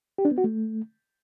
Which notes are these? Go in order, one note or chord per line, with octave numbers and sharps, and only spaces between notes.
G4
D4
B3
F#4
A3